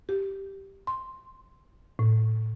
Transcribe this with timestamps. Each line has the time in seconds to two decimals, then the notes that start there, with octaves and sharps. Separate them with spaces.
0.09 G4
0.87 C6
1.99 A2